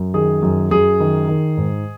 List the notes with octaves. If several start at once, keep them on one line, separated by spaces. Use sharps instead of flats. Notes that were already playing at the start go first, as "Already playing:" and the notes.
Already playing: F#2
D#3 G#4
F#2
F#2 G#4
D#3
D#3
G#2